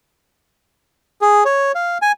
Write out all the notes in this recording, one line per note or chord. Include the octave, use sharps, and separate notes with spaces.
G#4
C#5
F5
G#5